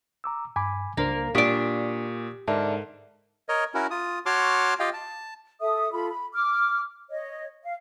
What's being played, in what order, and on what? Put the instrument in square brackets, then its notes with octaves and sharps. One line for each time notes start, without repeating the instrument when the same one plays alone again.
[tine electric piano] A#5 D6 E6
[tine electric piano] G2 [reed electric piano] G#5 B5 D6
[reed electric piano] C#2 D4 C5 [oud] A#3 [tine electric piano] A#6
[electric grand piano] A#2 [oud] D4 D5 [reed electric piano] G4 [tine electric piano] C#6 D#6 B6
[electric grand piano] G#2 A#4 [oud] D3 [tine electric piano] D5 E5 A5
[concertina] A#4 C#5 D#5
C#4 E4 F#4 A#4
F4 D#6
F#4 C#5 A5 C6 D6 F6
F4 G4 D#5 F5 G5
A5
[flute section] A4 E5 D#6
F4 A4 B5
B5
D6 F6
C#5 D#5
F5